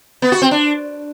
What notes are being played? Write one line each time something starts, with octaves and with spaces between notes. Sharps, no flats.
B3
F#4
C4
D4